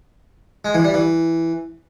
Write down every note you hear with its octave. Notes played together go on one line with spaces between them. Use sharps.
G#3
E3
G3
E3